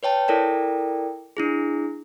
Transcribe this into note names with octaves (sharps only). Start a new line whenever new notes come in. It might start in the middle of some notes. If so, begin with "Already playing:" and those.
B4 C#5 G5 A5
E4 A4 A#4 D5 G5
D4 E4 G#4